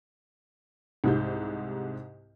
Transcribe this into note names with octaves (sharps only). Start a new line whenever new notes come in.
C2 G#2 C3 G6